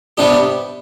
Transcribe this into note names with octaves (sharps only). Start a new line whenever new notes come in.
C3 G3 B3 D4 G4